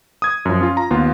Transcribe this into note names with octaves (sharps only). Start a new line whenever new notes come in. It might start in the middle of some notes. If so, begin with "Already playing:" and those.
D#6 G#6
F#2 F3
C#4 F4
A#5
D#2 B3 F4